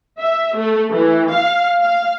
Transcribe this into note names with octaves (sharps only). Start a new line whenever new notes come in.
E5
A3
E3
F5
F5